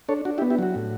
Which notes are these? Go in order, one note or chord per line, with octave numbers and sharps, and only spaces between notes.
D4 A4 C#5
D4 F#4
E4 G4
B3
E4 G4
F#3 F#4
A2